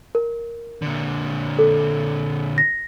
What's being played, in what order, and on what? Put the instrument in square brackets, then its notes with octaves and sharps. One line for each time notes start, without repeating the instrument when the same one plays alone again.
[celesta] A#4
[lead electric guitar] A#2 D3
[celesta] A4
A#6